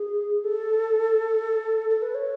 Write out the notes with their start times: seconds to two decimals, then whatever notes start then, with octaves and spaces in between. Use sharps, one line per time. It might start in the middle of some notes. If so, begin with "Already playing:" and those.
Already playing: G#4
0.44 A4
1.90 A4
2.02 B4
2.14 C#5